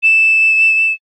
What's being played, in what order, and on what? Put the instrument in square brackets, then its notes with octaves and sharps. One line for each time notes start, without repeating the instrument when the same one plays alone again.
[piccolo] E7